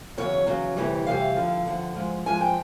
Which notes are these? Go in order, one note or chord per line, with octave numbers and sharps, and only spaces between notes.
E2 C#3 F#3 C#5
E2 C#3 F#3
D2 C3 E3 G3
D2 C3 E3 G3 F5
G2 D3 F3
G2 D3 F3 F#5
G#2 F3 G#3
G#2 F3 G#3 G#5
G5